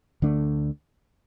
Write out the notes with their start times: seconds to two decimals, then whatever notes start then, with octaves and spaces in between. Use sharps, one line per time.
0.22 D2 D3 A3 D4